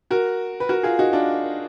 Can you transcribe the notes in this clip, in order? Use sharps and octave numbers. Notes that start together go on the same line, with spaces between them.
F#4 A#4
B4
F#4 A#4
F4 G#4
D#4 F#4
D4 F4